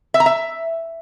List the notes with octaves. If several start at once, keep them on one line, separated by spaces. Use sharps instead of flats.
E5
A#5
E5